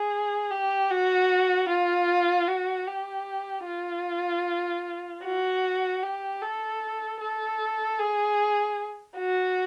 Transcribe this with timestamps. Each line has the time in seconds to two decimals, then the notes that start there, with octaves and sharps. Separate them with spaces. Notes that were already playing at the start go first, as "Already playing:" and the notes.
Already playing: G#4
0.51 G4
0.90 F#4
1.69 F4
2.48 F#4
2.87 G4
3.66 F4
5.24 F#4
6.02 G4
6.42 A4
7.21 A4
7.99 G#4
9.17 F#4